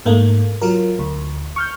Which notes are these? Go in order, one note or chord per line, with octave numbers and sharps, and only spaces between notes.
G#2 A3 A#3
F#3 F4 A#4
D2
C#6 F6 G6